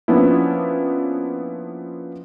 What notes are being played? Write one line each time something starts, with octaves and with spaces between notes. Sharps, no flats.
F3 A#3 B3 C#4 D4 E4